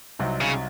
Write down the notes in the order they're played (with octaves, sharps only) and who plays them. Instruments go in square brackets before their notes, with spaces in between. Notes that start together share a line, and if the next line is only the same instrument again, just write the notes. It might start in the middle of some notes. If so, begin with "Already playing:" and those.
[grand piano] C2 C3 F#3 C4 D#4
[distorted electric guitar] C#3